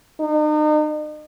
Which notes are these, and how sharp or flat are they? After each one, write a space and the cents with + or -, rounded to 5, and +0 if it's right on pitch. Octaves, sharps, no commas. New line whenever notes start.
D#4 -40